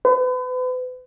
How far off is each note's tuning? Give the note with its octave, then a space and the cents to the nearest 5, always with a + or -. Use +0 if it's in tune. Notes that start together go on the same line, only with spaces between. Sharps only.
B4 +40